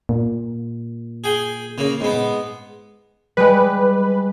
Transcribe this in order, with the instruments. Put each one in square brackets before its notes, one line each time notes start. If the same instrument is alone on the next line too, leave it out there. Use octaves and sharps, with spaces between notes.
[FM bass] A#2
[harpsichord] G#4 G5
C#3 A#3
G#2 B3
[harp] G3 G#3 [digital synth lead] B4